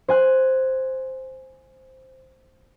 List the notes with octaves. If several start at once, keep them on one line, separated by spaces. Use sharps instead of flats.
C5 G#5 F#6